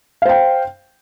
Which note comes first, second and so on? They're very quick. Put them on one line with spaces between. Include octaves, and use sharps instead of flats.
F5 C5 G5